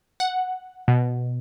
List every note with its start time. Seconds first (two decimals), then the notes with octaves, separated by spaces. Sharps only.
0.20 F#5
0.88 B2